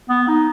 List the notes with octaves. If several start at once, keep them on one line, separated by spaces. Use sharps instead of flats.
B3
D#4